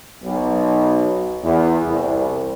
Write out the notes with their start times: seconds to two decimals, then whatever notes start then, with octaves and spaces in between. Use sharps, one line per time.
0.23 B1
1.43 E2
1.86 C2